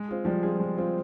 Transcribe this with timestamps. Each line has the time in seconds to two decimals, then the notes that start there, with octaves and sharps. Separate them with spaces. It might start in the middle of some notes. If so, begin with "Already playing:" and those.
Already playing: G#3
0.08 C4 F4 G#4
0.25 F3 G3 G#3
0.43 C4 F4 G#4
0.60 G#3
0.77 C4 F4 G#4